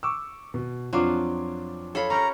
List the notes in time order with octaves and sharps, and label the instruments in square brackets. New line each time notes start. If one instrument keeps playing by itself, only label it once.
[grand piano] C#6 D6 E6
B2
[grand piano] F2 D4 D6 [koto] F3 F#3 [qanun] F4
[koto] A4 [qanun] C#5 F5 B5
[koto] C#4 G4 A#4 [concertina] A#5